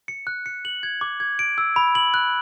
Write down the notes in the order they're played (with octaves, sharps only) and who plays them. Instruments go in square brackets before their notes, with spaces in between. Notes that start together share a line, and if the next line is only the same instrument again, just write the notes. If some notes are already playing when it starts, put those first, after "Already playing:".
[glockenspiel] C#7
F#6
C#7
F#7
G#6
D6
G#6
D7
E6
B5
F#7
F#6